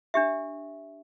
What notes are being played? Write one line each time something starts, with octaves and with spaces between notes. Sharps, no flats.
D4 G4 E5